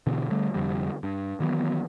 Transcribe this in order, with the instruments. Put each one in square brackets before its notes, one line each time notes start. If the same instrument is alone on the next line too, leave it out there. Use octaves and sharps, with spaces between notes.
[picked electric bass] B2 D3 E3
D3 G3 A3
F1 F2 D3 G3
G2
D#3 E3 F#3 B3